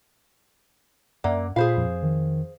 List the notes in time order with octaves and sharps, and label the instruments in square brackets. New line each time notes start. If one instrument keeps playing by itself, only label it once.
[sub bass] F#2 [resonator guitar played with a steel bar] A#3 [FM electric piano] D5 E5 F#5
[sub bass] A#2 [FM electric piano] F4 B5 [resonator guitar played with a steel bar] G#4 C5 F5
[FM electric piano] F2
[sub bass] D#3